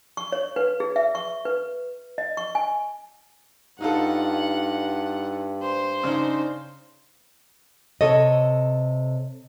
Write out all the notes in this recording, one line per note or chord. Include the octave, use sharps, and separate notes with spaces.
C#6
C#5
B4
G#4
E5
C#6
B4
D#5
C#6
G#5
G2 D#4 F4 A4 F#5
C5
C#3 D4 D#4
C3 A4 C#5 D#5